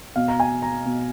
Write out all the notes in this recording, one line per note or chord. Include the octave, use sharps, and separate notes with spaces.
B2 F5
A#5
G#5
A#5
B2